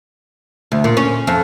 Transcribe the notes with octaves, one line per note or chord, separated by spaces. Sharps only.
D2
A#2
C#4
F2